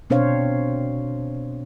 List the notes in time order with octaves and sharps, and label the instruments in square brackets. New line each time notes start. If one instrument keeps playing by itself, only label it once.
[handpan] B2 C4 D4 C5 C#5 F5